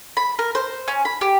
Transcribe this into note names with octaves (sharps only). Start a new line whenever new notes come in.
B5
A#4
C5
C#4
B5
G4